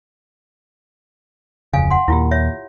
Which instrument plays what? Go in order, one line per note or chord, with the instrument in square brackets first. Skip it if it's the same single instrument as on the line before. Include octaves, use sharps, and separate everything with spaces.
[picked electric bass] D1 F2 C#3 [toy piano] F5 G#5
[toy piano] F#5 C6
[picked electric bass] D#2 A#2 [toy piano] E4 F4 G4
[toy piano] C#5 E5